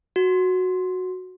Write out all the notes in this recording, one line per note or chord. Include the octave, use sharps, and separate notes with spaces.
F#4